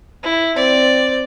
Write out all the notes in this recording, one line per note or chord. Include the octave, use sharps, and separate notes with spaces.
E4
C4 D5